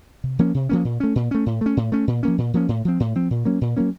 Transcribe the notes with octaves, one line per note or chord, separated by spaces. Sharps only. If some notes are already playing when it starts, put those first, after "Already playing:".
C3
F3 A#3 C#4
C3
F3 A#3 C#4
A#2
A3 C#4
A#2
A3 C#4
A2
A3 C#4
A2
A3 C#4
A#2
F3 A#3 C#4
A#2
F3 A#3 C#4
A2
F3 C4
A2
F3 C4
A#2
F#3 A#3 C#4
A#2
F#3 A#3 C#4